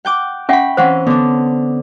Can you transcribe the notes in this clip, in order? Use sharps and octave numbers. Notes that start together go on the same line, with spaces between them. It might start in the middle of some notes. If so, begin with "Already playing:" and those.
F#5 G5 D6
C#4 E5 F#5 G5 B5 C#6
E3 C4 C#4 C5 F5 F#5
D3 B3 D4